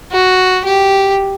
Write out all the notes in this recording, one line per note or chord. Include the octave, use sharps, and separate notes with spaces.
F#4
G4